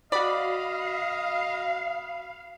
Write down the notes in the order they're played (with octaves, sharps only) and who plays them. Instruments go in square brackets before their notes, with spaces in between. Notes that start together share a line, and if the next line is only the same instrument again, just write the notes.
[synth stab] F#4 B5 [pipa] D5 [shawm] D#5 [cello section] F5